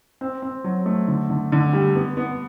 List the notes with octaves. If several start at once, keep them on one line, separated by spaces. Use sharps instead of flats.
C4
C4
F#3
A3
D3
D3
D3
G3
B3
B3